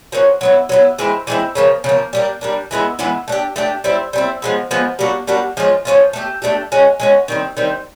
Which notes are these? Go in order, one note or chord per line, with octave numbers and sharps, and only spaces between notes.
F3 A#3 C#4 F#4
F#3 B3 E4
F#3 B3 E4
E3 G#3 C4 E4
E3 G#3 C4 E4
C#3 F3 A#3
C#3 F3 A#3
G3 A#3 D4
G3 A#3 D4
E3 G#3 B3 E4
E3 G#3 B3 E4
A3 D4 G4
A3 D4 G4
G3 C4 E4
G3 C4 E4
F3 G#3 B3
F3 G#3 B3
G3 A#3 D4 F#4
G3 A#3 D4 F#4
F3 G#3 C#4 F4
F3 G#3 C#4 F4
A3 D4 G4
A3 D4 G4
G#3 C#4 F#4
G#3 C#4 F#4
D#3 G3 C4
D#3 G3 C4